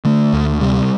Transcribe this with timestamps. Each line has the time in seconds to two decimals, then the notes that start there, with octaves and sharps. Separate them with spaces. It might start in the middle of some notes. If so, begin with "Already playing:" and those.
0.05 D3 A3
0.33 D2
0.61 C3 G3